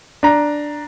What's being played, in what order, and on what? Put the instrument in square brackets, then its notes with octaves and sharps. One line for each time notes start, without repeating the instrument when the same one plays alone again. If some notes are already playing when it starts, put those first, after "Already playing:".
[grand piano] D4 A#5